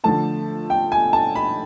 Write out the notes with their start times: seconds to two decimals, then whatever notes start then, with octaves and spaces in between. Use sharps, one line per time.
0.04 D3 F3 A3 A5
0.70 G5
0.92 G#5
1.13 A5
1.35 B5